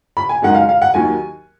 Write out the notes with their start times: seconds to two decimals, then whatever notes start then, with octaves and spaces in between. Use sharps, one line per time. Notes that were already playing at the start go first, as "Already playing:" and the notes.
0.17 B5
0.29 G#5
0.42 F#2 D#3 G#3 F#5
0.55 F5
0.69 F5
0.82 F#5
0.94 D#2 D#3 F#3 G#5